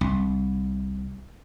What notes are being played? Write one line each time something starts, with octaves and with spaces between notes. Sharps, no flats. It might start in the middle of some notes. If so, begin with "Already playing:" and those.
C2